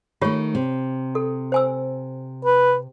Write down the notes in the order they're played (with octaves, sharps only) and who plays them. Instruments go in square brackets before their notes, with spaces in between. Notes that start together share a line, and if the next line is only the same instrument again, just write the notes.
[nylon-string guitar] D#3 A3 [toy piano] F4 G4 C#5
[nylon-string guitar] C3
[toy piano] A4
C5 G#5 E6
[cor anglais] B4